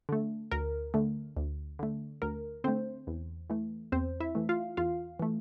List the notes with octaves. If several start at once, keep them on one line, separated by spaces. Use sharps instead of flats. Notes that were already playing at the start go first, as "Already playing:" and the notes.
D3 A3
D2 A#4
D3 A3
D2
D3 A3
D2 A#4
D3 A3 C4 C5
E2
E3 A3
E2 C4 C5
E4 E5
E3 A3
F4 F5
E2 F4 F5
E3 A3